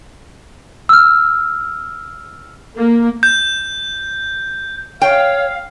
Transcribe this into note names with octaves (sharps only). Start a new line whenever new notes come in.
E6 F6
A#3
G6
C#5 F5 G5